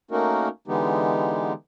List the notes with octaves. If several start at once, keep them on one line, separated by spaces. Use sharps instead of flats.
A3 A#3 C#4 D#4 F#4 A#4
D3 E3 G#3 B3 D#4 G4